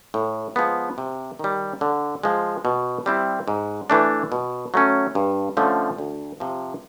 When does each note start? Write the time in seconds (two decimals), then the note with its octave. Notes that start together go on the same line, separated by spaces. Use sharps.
0.14 A2
0.56 F3 G#3 B3
0.98 C3
1.39 D#3 G3
1.81 D3
2.23 F3 G#3
2.65 B2
3.06 G3 C4 E4
3.48 G#2
3.90 E3 A3 D4
4.32 B2
4.74 F#3 A3 C#4
5.15 G2
5.57 D3 F3 A3 C#4
5.98 D2
6.40 C3 F3